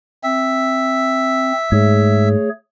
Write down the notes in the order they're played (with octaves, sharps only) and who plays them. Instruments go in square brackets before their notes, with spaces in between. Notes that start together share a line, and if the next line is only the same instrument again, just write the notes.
[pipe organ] C4 [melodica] E5
[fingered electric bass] G#2 [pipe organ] A3 G#4 C#5